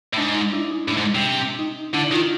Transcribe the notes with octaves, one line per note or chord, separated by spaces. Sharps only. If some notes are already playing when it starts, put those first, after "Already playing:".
A2
G#2 D4
D#4
D4 E4
D#4
A2 D4
G#2
C3
D#4
D3 D4 E4
D#3 D#4 F4